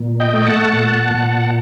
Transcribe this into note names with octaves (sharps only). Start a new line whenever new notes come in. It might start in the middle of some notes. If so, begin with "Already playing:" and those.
Already playing: A#2
D#5 G5
A3
F#5 A5
A#2
A#2